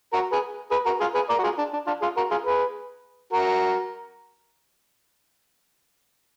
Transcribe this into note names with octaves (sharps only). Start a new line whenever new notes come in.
F#4 A#4
G#4 B4
G#4 B4
F#4 A#4
F4 G#4
G#4 B4
A#4 D5
F#4
F4 G#4
D4
D4
D4 F4
F4 G#4
F#4 A#4
F4 G#4
G#4 B4
F#4 A#4